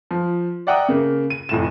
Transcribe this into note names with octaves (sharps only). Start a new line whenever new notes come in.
F3
D5 E5 F#5 G5 A#5 D#6
C#3 A#3
D#7
F1 A2 E7